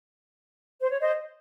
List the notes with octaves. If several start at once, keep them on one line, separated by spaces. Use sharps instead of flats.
C5
C#5
C5 D#5